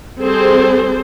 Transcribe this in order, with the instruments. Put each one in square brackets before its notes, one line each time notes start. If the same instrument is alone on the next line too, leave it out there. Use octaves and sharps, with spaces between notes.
[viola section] G3 C4 G#4 A4 C5